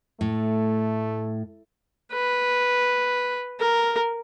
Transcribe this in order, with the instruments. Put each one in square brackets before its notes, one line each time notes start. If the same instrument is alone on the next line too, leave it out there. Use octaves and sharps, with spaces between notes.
[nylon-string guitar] A2 [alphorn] A3
[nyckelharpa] B4
A#4